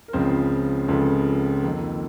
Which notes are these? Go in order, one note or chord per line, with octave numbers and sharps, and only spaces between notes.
A#4
C#2 C#3 F3 C4 C5
C#2 C#3 F3 C4 A4
F2 D#3 A#3